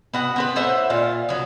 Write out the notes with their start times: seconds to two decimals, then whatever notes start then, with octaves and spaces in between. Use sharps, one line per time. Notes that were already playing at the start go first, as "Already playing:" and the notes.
0.14 B3 F#4 F#5
0.36 B3 C4 B4
0.56 A2 C5 E5 F#5
0.90 A#2 F4
1.29 F#3 B3